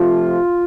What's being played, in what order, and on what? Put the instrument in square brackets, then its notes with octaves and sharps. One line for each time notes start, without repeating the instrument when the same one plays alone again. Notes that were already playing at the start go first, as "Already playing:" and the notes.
Already playing: [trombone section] C3 F3 A3 F4